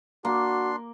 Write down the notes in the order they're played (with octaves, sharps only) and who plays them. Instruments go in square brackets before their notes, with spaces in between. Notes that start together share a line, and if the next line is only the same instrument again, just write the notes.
[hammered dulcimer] A#3 [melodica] D4 C6 [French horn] F#4